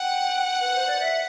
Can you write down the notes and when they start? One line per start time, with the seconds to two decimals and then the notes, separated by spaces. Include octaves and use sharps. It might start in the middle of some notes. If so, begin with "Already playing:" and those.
Already playing: F#5 G5
0.60 B4
0.74 C5
0.87 D5
1.00 E5